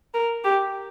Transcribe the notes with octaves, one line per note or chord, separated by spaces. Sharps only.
A#4
G4